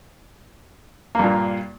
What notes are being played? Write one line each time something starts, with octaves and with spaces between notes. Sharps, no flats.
G2 A#2 A#3